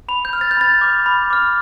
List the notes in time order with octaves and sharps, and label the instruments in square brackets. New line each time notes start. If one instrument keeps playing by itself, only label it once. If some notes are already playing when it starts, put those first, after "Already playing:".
[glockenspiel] B5 F7
G6
F6
A6
G6
B5 A6
D6 F6
B5
D6 F6